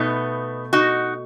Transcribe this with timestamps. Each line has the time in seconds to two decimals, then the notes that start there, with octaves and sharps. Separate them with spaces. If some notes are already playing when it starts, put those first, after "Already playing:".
Already playing: B2 A3 B3 D#4
0.73 D#4 F#4